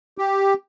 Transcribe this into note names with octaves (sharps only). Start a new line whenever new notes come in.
G4